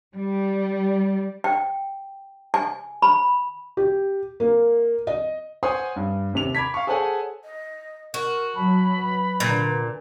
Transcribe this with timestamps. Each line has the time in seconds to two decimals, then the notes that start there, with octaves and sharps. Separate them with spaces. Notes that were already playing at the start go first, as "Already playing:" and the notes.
0.15 G3
1.44 G5
2.54 G#5
3.02 B5
3.77 G4
4.40 A#3
5.07 D#5
5.63 C5 C#5 F#5 G#5 C6 D#6
5.96 G2
6.33 D#2 C3 F7
6.54 B5 D6 G#6 B6
6.74 F5 C#6
6.87 G#4 A4 C5 C#5 F#5 G#5
7.44 D#5
8.14 F#4 A#4
8.55 F#3 A5 B5
8.97 B4
9.40 A#2 D3